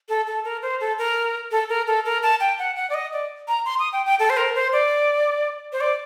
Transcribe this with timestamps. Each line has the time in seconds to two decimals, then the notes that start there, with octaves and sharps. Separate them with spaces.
0.09 A4
0.27 A4
0.44 A#4
0.62 C5
0.80 A4
0.98 A#4
1.52 A4
1.69 A#4
1.87 A4
2.05 A#4
2.23 A5
2.40 G5
2.59 F#5
2.76 F#5
2.90 D5
2.94 D#5
3.13 D5
3.48 A#5
3.65 C6
3.79 D#6
3.93 G5
4.06 G5
4.20 A4
4.30 C5
4.37 A#4
4.55 C5
4.73 D5
5.73 C5
5.81 D5